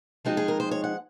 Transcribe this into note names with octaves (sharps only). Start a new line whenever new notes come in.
F3 G#3 C4 D#4 F#4
G#4
A#4
C5
C#5
F#5